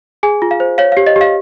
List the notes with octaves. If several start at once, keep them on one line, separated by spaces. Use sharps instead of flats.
G#4 G#5
F4
F5
C5
C#5 F5
G4 F5
D#5
G4
F5